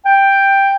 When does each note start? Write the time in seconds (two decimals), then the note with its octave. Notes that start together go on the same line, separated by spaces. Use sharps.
0.06 G5